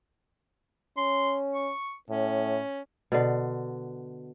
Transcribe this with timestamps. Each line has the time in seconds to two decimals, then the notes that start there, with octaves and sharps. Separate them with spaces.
0.97 C#4 C6
1.54 C#6
2.09 A2 C#4
3.12 B2 D3